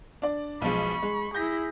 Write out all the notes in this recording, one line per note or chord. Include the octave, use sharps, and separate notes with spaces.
D4 D5
B1 F3 G#3 B5 C#6
G#3
E4 G#4 G6 A#6 B6